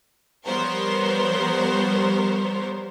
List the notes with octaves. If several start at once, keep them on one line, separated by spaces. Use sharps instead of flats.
F3 G3 B3 A#4 C5 C#5